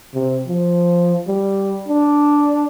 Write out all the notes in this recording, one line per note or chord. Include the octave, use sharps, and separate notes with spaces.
C3
F3
G3
D4